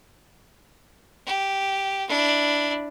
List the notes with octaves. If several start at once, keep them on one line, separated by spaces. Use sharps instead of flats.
G4
D4 E4